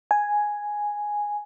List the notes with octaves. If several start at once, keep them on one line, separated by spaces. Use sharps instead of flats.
G#5